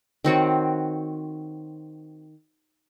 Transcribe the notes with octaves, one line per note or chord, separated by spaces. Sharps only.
D#3 C4 F#4 C#5